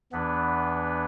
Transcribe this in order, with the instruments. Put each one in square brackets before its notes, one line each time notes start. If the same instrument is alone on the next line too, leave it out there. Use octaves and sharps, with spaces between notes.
[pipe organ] E2 E3 B3 D4 B4